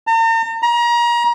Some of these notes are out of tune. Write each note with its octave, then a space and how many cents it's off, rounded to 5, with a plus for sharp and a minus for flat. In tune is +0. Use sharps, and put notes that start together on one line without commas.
A#5 -45
A#5 +30